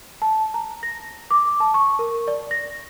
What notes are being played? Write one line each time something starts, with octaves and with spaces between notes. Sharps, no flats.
A5
A#5
A#6
D6
A5
C#6
A#4
D5
A#6